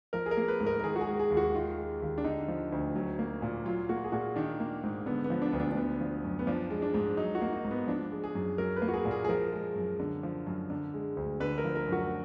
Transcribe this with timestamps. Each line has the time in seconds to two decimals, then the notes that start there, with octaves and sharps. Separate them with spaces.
0.13 F3 A#4
0.26 G#4
0.31 A#4
0.37 A#3
0.48 B4
0.60 G#2
0.67 A#4
0.79 A#4
0.84 D#3 G#4
0.96 F#4
1.01 G#4
1.07 G#3
1.19 G#4
1.30 D#2
1.37 F#4
1.54 D#3 F4
1.78 G#3
2.02 D#2
2.18 D4
2.24 D3 D#4
2.48 F3
2.72 D2
2.95 F#3
3.19 A#3
3.42 A#2
3.65 F#3 F4
3.89 A#3 F#4
4.04 G#4
4.12 A#2 F#4
4.36 D#3 D4
4.60 A#3
4.83 G#2
5.06 D3 B3
5.24 B3
5.30 F3
5.42 D4
5.52 D2 B3
5.60 D4
5.72 D4
5.77 D3 B3
6.00 F3
6.24 F#2
6.39 B3
6.47 F3 D4
6.70 G#3
6.82 D4
6.94 G#2
7.17 F#3 D#4
7.35 F#4
7.42 A#3
7.53 D#4
7.65 G#2
7.71 B3
7.87 F3 D4
8.11 G#3
8.24 G#4
8.35 F#2
8.58 F#3 A#4
8.76 B4
8.82 A#3
8.88 F#4
8.94 G#4
9.05 A#2
9.11 G#4
9.25 G#4
9.29 F3 A#4
9.52 G#3
9.76 F#2
10.00 D3
10.23 F3
10.47 F#2
10.70 D3
10.94 G#3
11.17 D2
11.40 D3 B4
11.58 A#4
11.64 F3
11.75 A#4
11.87 F#2
11.92 F#4